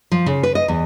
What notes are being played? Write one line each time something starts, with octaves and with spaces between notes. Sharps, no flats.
F3
C#3
B4
D#5
E2